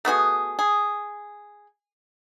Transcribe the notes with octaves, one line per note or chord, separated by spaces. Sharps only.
A3 B3 F#4 G#4
G#4